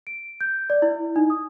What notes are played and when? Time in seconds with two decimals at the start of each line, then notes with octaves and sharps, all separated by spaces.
0.07 D7
0.41 G6
0.70 D5
0.82 E4
1.16 D#4
1.30 D#6